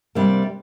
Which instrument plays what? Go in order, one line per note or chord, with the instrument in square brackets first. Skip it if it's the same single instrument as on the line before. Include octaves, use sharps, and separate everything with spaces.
[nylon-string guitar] C3 G3 A#3 D4